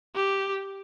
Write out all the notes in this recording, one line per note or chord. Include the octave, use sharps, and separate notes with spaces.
G4